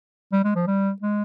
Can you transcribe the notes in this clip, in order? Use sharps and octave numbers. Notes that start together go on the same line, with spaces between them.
G3
G#3
F3
G3
G#3